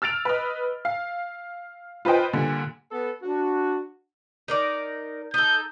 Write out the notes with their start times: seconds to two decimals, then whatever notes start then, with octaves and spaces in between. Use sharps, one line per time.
0.02 E6 F6 A6 D7 F7
0.25 B4 D#5
0.85 F5
2.05 F4 B4 C5 D#5 G5
2.33 A#2 D3 G3
2.92 B3 A4
3.22 D4 F#4
4.48 D#4 A#4 D5
5.34 D#4 A4 G6